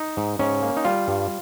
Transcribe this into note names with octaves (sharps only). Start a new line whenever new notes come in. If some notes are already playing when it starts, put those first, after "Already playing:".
Already playing: D#4
G#2
G#2 C#4
A#3
D#4
G3 F4
G2